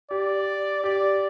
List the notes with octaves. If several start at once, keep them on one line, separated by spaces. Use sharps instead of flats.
G4 D5
G4 D5